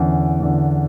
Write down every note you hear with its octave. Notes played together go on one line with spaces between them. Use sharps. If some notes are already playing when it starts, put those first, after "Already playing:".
Already playing: E2 D3 C#4
E2 D3